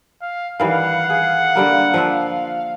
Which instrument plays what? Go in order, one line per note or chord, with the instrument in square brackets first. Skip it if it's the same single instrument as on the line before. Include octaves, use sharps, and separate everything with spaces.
[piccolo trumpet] F5
[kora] D#3 E3 G3 [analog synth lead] F5 [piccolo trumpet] F#5
[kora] G#4
D3 G3 A#3
F3 D4 E5